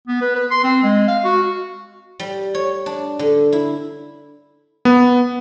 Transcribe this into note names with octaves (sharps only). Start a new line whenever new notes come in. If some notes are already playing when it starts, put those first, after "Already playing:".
B3
B4
B4
C6
C4
G#3
F5
F#4
G3
C#5
D4
D3
E4
B3